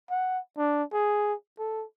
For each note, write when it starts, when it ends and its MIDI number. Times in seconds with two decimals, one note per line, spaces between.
0.10 0.39 78
0.58 0.83 62
0.93 1.34 68
1.59 1.85 69